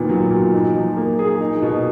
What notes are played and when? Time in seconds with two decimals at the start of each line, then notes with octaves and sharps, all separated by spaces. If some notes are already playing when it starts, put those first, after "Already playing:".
Already playing: A#2 D#3 B3
0.09 F#3
0.30 A#2
0.53 D#4
0.75 F3
0.97 A#3
1.19 G#4
1.41 D#4
1.62 B2